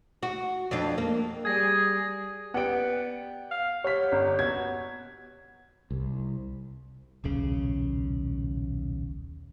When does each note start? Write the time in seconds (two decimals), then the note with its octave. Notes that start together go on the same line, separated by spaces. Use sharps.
0.23 F#4
0.71 F2 D4 F4
0.98 A#3
1.45 G3 G#4 G#6 A#6
2.54 B3 G4 D5 F#5 G5 D7
3.51 F5
3.84 G4 C#5 F#5 F6 B6
4.12 G1
4.39 B3 F#4 G#6
5.91 C2
7.24 D#1 B1 C#3